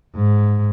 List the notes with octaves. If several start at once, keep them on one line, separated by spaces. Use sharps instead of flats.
G#2